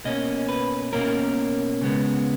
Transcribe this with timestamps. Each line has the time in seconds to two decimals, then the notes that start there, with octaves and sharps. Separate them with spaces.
0.05 B2 A#3 C#4 D#5
0.49 B4
0.93 B2 A#3 C#4 A#4
1.82 C#3 G#3 B3